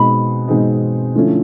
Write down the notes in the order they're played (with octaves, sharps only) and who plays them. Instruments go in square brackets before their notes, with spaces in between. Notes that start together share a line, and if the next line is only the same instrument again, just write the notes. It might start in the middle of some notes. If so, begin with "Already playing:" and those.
Already playing: [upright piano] B2 G#3 C4 D#4 [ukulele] B5
[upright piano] B2 G#3 C4 D#4
D3 F3 A3 C#4 E4